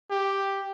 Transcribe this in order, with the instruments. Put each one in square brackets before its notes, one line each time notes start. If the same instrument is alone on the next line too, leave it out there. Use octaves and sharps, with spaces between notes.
[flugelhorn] G4